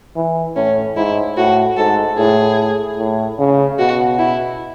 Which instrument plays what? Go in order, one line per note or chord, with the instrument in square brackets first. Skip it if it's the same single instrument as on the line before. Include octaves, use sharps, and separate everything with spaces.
[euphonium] E3
[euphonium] A2 [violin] C#4
[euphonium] G#2 [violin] E4
[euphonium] A2 [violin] F#4
[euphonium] G#2 [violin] A4
[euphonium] A2 [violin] G#4
[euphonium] A2
C#3
[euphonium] B2 [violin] F#4
[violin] E4